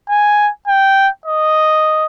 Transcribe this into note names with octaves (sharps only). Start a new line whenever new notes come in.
G#5
G5
D#5